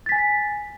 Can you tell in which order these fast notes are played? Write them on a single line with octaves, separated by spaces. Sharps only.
A6 B6 G#5